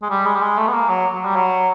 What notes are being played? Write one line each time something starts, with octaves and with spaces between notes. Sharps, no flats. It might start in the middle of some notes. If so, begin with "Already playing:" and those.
G#3
G3
G#3
G3
G#3
A3
B3
A#3
F#3
F#3
G3
F#3